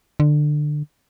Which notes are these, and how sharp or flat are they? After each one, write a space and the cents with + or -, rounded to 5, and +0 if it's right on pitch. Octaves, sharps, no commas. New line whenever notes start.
D3 +20